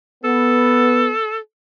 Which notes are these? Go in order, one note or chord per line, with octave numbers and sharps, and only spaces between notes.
B3 A4